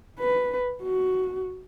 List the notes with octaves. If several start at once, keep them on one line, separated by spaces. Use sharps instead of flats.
B4
F#4